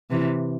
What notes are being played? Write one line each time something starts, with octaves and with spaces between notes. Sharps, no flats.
C3 E3